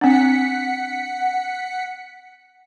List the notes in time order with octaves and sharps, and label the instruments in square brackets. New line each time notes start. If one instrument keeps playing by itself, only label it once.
[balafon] C4 D4 [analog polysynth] F#5 B6 C#7